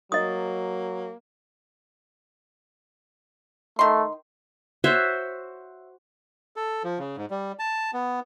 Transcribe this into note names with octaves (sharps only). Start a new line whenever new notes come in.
F#3 A#3 D#5 D#6
D#3 A3 C6
F#4 C5 C#5 E5
A4
F3
C#3
G#2
G3
A5
B3